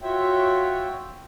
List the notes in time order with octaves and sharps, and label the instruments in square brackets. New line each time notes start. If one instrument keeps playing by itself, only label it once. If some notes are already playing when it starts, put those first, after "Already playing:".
[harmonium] F4 F#4 C#5 E5 G5